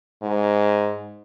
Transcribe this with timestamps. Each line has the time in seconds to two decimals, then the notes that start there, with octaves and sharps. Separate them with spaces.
0.23 G#2